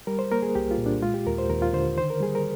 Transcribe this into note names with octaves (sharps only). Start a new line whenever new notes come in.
G3 A#4
C5
A#3 A#4
G#4
C2 G4
F4
A#2
D4
G#3 F4
G4
D#2 A#4
C5
D#2 A#4
F4
D3 C5
D#3 C5
A#4
G3 G#4
A#4